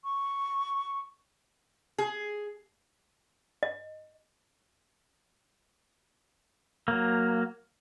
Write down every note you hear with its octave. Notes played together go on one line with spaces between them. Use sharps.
C#6
G#4
D#5
F#3 A#3